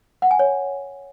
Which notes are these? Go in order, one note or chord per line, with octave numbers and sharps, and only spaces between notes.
F#5
G#5
C#5